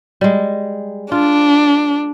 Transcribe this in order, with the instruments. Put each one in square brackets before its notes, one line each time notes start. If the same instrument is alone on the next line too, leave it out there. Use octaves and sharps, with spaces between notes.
[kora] G3 G#3
[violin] D4 [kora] F4